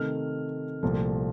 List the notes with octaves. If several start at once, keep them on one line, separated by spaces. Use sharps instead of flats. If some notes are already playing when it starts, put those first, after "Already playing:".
Already playing: C3 D#3 A3 F6
C2 A#2 F3 A3